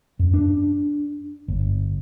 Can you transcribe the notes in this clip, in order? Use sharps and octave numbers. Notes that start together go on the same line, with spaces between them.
F#2
D4
G1